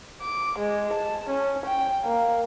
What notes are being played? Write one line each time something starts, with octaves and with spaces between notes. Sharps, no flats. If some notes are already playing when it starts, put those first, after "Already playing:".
D6
G#3
A5
C#4
G5
A#3